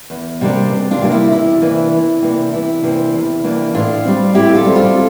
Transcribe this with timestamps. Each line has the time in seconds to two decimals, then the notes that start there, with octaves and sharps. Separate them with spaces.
0.10 E2
0.41 C3 G3 A#3 D4
0.70 E2
0.91 D4 F4
1.01 C3 G3 A#3 D4
1.11 E4
1.32 E2 E4
1.62 C3 E3 A#3 D4
1.92 E2
2.22 C3 E3 A#3 D4
2.52 E2 E4
2.83 C3 E3 A#3 D4
3.14 E2
3.43 C3 E3 A#3 D4
3.74 A2 D4 F4
4.05 G3 C4
4.34 A2 E4 G4
4.55 F4 A4
4.65 G3 C4
4.75 F4 A4